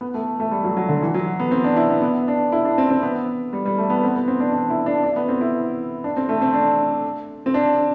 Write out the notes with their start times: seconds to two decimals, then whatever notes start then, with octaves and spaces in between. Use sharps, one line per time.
0.01 B3
0.14 A3
0.40 A3
0.51 G3
0.64 F#3
0.77 F#3
0.89 D3
1.02 E3
1.14 F#3
1.40 B3
1.51 C4
1.64 D4
1.76 E4
1.89 B3
2.02 B3
2.28 D4
2.52 E4
2.65 D4
2.78 C4
2.90 C4
3.02 B3
3.53 G3
3.66 G3
3.78 A3
3.90 B3
4.03 C4
4.16 B3
4.28 C4
4.40 D4
4.53 D4
4.70 E4
4.86 D4
5.03 D4
5.16 B3
5.29 C4
5.41 E4
6.04 D4
6.17 C4
6.29 A3
6.42 C4
6.54 D4
7.46 C4
7.54 D4